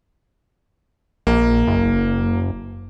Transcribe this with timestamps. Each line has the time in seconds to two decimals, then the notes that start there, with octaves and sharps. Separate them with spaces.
1.27 A#1 A#3
1.67 F#1